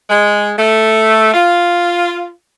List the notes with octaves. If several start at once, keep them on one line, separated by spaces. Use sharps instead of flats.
G#3
A3
F4